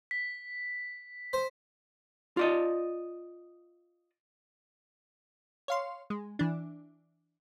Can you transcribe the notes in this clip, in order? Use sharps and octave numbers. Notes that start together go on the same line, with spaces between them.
B6
C5
F4 D5 D#5
C#5 F5 C6
G#3
E3 D4